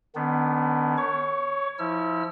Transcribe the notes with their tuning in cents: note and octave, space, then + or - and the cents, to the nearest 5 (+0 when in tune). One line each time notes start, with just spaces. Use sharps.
D#3 -35 B3 +15 D4 -35
C#5 +0 C#6 +30
F3 -5 E4 -30 E6 +45